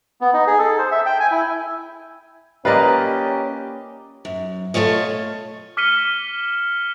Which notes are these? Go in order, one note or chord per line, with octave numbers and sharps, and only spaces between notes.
B3
D#4
G#4
A4
C5
E5
G5
G#5
E4
A#3 C#4 F4 G4 B4 D5 D#5
F#2
B2 A3 F4 C#5 D#5
D6 F6 B6 C#7 D#7 G7